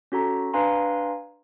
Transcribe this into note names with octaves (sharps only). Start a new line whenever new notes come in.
C#4 F#4 A4 A#5
D4 B4 F5 G#5 A#5 C6